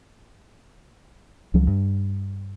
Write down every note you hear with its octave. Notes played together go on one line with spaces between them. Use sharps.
C#2 F3 F#3
G2